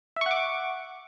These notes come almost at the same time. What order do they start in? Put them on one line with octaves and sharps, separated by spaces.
E5 C#6 F#5 D6